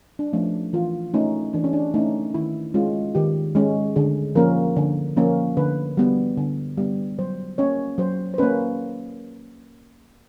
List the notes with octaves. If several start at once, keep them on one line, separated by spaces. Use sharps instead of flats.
D4
F3 A3 C#4
E3 F4
A3 C#4 D#4
E3 D4
C#4
D4
A3 C#4 D#4
D#3 E4
G#3 C#4 F4
D#3 G4
G#3 C#4
D3 G#4
F3 A#3 C#4 A#4
D3
F3 A#3 C#4
D3 B4
G3 B3
D3
G3 B3
F#3 C5
A#3 C#4 C#5
F#3 C5
C5
A#3 C#4 B4